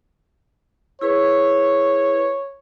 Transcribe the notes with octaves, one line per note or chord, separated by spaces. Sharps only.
E4 G#4 B4 C#5